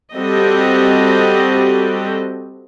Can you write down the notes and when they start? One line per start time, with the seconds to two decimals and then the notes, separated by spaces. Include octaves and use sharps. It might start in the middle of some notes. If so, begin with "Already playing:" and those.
0.14 G3 C4 F#4 G4 A4 D#5